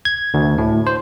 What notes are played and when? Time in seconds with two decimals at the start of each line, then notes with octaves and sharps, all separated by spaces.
0.05 G#6
0.34 D2
0.58 A2
0.87 C5